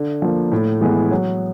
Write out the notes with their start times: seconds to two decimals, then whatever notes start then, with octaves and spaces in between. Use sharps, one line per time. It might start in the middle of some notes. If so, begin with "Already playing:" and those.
Already playing: D3
0.22 F3 A#3
0.52 A2
0.81 E3 G#3 B3
1.11 F#3